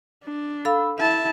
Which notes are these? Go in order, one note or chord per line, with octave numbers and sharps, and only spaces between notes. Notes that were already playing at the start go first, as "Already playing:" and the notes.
D4
A4 F5 B5 E6
E4 E5 A5